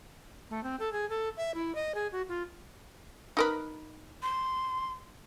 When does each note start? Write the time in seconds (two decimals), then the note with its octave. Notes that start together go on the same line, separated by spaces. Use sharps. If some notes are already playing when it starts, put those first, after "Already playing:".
0.50 A3
0.63 C4
0.79 A4
0.92 G#4
1.09 A4
1.37 E5
1.54 E4
1.75 D#5
1.94 G#4
2.12 F#4
2.28 F4
3.37 D#4 A#4 B4
4.23 C6